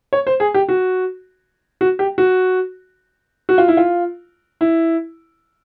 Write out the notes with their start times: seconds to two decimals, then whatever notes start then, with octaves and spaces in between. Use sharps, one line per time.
0.13 C#5
0.27 C5
0.40 G#4
0.54 G4
0.69 F#4
1.81 F#4
1.99 G4
2.18 F#4
3.49 F#4
3.58 F4
3.68 E4
3.77 F4
4.61 E4